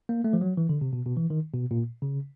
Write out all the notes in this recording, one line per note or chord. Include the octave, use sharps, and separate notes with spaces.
A#3
A3
F3
F#3
E3
D3
C3
B2
B2
E3
D#3
B2
A#2
C#3